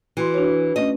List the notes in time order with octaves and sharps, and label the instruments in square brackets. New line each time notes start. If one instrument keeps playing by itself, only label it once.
[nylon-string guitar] E3 [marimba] F#4 C6
[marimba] D4 F#4 C#5
[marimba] A3 C#4 [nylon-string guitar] D#5